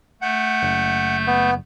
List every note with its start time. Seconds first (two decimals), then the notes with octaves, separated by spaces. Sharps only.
0.22 A3 F#5 G6
0.62 F#1
1.27 B3